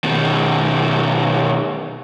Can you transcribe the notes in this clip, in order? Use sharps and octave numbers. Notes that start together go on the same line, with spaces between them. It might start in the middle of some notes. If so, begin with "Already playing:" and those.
B2 D#3